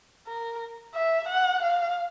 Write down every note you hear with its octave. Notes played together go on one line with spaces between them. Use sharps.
A#4
E5
F#5
F5